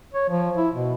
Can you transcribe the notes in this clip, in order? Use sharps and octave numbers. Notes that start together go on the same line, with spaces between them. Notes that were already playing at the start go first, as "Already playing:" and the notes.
C#5
F3
E4
B2